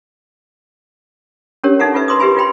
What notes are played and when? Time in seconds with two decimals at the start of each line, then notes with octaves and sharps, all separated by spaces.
1.64 C#4 D4 G4 A#4 C#5
1.79 D#4 A4 E5 F#5 A#5
1.94 F4 A4 B4 E5
2.08 A#4 B4 C6 D6 D#6
2.19 E4 G4 B4 E5 G#5 B5
2.37 F4 B4 G5 B5 C6